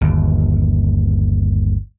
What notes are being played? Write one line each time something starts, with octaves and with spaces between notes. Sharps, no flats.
G1 D#2